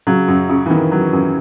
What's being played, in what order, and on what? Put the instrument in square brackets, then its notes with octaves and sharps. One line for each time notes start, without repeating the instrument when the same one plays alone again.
[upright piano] C#3 [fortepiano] F#3
[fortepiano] F#2
C#3
[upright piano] E3
[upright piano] D#3 [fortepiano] B3
[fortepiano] F#3
F#2